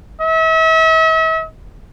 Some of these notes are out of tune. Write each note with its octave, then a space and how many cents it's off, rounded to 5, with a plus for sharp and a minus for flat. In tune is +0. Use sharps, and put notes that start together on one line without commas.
E5 -40